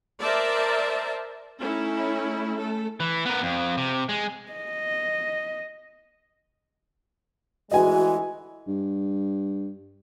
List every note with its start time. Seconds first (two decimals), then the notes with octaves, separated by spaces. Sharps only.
0.21 A#4 C5 D5 E5 A5
1.60 A3 C#4 D#4 E4
2.57 A3 A4
3.00 E3
3.25 B3 A#4
3.43 F2
3.77 C3
4.09 G#3
4.52 D#5
7.71 D2 E3 G#3 F#4 D#5 G#5
8.67 G2